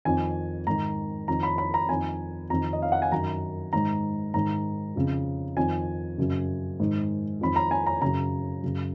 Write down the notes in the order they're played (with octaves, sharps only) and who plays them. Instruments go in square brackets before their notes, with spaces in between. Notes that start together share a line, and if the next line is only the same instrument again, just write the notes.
[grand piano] F2 D#3 G#5
G#2 D#3 A#5
F2 D#3 A#5
B5
B5
A#5
F2 D#3 G#5
F2 D#3 A#5
D#5
F5
F#5
G#5
F#2 D#3 A#5
G#2 D#3 A#5
G#2 D#3 A#5
F2 C#3
F2 D#3 G#5
F#2 C#3
G#2 D#3
F2 D#3 B5
A#5
G#5
A#5
F#2 C#3 A#5
F#2 C#3